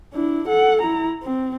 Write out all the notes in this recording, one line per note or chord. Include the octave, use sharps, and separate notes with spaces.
D4 E4
A4 F#5
E4 A#5
C4